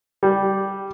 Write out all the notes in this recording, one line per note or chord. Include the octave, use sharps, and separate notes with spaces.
G3